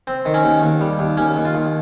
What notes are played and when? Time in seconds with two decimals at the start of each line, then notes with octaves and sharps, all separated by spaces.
0.07 C4
0.26 D#3
0.34 C#4
0.44 D#2
0.63 D#2
0.81 G3
0.99 D#2
1.17 D#2 C#4
1.36 D#2
1.45 F4
1.55 D#2